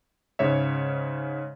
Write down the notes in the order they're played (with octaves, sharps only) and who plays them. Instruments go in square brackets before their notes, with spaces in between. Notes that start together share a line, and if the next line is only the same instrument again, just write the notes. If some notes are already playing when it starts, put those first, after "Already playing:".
[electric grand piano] G#2 C#3 C#5 E5